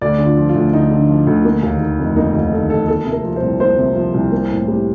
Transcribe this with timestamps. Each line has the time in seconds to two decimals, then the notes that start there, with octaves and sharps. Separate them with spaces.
0.01 D2 D5
0.19 D3
0.25 F4
0.37 F3
0.49 F4
0.55 D2
0.73 D2 D#4
0.91 D3
1.09 F3
1.27 D2
1.45 A#3
1.63 D#2
1.80 D#3
1.99 F1
2.16 A#3 D#4
2.34 D#2
2.52 D#3 A4
2.70 F1 A4
2.88 A#3 A4
3.06 C3
3.12 A#4
3.24 F3
3.36 C5
3.42 C2
3.60 A#3 C5
3.78 C3
3.96 F3
4.14 C2
4.32 A#3
4.50 A2
4.68 G3